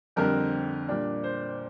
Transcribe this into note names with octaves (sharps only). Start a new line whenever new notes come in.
F2 D3 G3 C4 A#4
A#2 G3 D4
C5